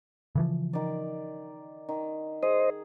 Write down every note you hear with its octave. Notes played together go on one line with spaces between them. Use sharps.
C#3 E3 F3
D#3 D5
D#3
G#4 C5 D#5